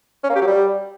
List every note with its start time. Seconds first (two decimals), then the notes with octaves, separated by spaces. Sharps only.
0.24 C#4
0.30 A#3
0.36 G4
0.41 F#3
0.47 G3